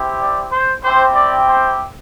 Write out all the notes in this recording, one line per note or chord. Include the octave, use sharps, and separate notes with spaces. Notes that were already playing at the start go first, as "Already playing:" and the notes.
Already playing: C4 E4 G4
D5
C5
C4 E4 G4 C5
D5
C5